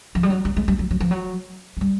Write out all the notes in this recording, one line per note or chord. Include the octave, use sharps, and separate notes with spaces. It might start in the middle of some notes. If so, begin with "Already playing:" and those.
F3
G3
F#3
G3
G#3
G3
F#3
F#3
F3
F#3
G#3
G3